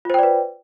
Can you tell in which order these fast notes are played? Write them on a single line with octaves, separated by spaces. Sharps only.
F4 C5 G5 D5 B4